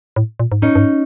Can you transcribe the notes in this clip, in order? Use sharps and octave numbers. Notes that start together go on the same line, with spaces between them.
A2
A#2
G#2
A2 C#4 D#4
G2
G#2